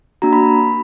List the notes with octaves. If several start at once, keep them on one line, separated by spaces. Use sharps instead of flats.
A#3 D4 F#4 A#5
B5